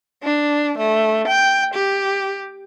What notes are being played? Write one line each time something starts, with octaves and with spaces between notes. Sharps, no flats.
D4
A3
G5
G4